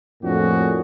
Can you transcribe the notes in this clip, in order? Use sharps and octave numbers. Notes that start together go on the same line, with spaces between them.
F2 A2 A#3 D4 F#4 G#4